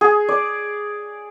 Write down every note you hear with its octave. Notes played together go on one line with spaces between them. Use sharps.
G#4
D5